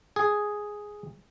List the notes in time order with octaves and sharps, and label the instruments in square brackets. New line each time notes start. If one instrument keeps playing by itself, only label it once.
[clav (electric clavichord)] G#4